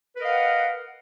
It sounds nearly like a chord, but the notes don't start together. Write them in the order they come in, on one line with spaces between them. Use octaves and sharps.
B4 A#4 D#5 F5 F#5